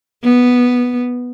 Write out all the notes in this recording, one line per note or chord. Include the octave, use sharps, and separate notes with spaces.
B3